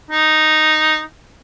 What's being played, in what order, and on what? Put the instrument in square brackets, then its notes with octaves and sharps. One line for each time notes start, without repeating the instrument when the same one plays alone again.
[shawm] D#4